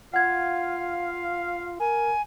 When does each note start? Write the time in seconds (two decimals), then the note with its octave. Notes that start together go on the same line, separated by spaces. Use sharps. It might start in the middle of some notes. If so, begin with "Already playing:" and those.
0.14 F4 F5 F#5 G#6
1.80 A#4 G#5